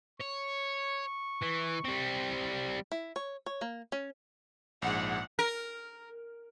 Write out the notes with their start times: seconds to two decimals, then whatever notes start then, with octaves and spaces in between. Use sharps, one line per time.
0.20 C#5 C#6
1.42 E3
1.85 G3 C4
2.92 E4
3.16 C#5
3.46 C#5
3.61 A#3
3.92 C#4
4.82 A#1 G#2 F#5
5.39 A#4